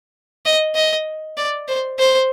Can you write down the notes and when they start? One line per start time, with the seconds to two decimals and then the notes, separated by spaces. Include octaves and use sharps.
0.45 D#5
0.75 D#5
1.37 D5
1.68 C5
1.99 C5